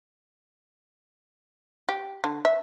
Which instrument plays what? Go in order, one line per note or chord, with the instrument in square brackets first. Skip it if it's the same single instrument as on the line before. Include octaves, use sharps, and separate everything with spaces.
[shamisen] G4
D3
E5